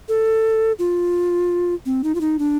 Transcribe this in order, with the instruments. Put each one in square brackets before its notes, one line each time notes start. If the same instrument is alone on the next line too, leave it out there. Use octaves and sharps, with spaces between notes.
[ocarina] A4
F4
C4
D#4
F4
D#4
D4